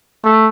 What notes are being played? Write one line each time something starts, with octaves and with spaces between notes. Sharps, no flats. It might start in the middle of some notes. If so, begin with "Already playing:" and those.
A3